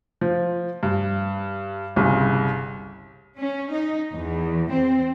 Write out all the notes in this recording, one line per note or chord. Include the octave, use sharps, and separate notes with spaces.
F3
G2
G1 C2 C#3
C#4
D#4
E2
C4